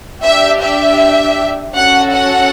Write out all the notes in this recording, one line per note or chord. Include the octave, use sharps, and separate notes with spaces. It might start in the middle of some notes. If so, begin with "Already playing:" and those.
D4 G4 E5
E5
C#4 F#4 A4 F#5
F#5